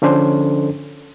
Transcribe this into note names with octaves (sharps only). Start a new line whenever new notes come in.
D3 F3 C#4 D4 A4 C5